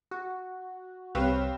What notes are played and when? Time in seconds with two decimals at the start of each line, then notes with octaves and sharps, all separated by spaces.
0.11 F#4
1.15 C2 C4 G4 B4 C#5 F5